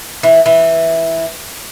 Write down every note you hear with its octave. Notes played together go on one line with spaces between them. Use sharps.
E3
E3